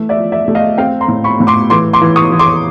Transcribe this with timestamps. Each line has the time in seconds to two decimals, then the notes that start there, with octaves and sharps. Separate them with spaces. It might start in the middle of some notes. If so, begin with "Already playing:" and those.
Already playing: E3 A3
0.09 D5 E5
0.17 F3
0.32 D5 E5
0.48 A3
0.55 D#5 F5
0.78 C4 F5 G5
1.01 A#5 C6
1.08 A2
1.24 B5 C#6
1.40 A2
1.47 C6 D6
1.70 E3 C6 D6
1.93 C6 D6
2.01 E3
2.16 C#6 D#6
2.32 E3
2.39 C6 D6